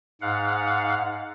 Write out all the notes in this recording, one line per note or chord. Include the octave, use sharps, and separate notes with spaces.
G#2 F5 F#5